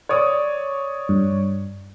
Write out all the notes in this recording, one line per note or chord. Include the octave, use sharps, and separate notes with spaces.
C#5 D5 D#6
G2